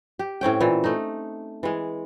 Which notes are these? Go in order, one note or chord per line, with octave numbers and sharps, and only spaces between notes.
G4
A2 C4 C#4 G5
A#2 E3
A3 D#4
E3 G#3